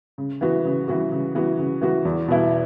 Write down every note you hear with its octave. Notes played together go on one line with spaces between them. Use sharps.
C#3
E3 B3 F#4
C#3
E3 B3 F#4
C#3
E3 B3 F#4
C#3
E3 B3 F#4
E2
B2 B3 E4